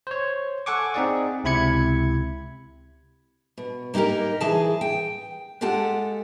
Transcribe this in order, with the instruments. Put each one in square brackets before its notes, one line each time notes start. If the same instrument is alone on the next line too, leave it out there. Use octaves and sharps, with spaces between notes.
[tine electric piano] C5 C#5
A4 F#5 G#5 C#6 D6
C4 D#4 G#4 D5 F#5
C#2 C3 E4 B5 G#6 C#7
[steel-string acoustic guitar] B2
A#3 D#4 F4 G4 A#4
E3 G#4 A5
G5
G#3 F4 G4 A4 F#5